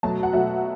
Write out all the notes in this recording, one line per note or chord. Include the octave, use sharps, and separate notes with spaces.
B2 F#3 A3 A5
F#5
B2 F#3 A3 E5